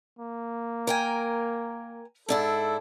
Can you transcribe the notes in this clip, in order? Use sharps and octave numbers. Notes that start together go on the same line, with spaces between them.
A#3
A#4 G5 G#5
G#2 D4 E4 A4